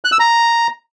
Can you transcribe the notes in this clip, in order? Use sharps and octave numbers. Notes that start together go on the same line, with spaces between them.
F#6
E6
A#5